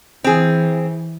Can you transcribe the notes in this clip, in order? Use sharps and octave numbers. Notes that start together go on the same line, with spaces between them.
E3 C4 G#4